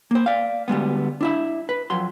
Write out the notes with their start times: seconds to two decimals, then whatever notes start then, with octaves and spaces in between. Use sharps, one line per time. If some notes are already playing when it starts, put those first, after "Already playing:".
0.11 A#3 C5
0.26 D5 F5
0.68 D2 G3 G#3 B3
1.21 D4 E4 E5
1.69 B4
1.90 F2 F#3 C6